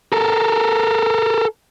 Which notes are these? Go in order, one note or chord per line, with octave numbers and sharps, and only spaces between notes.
A4 A#4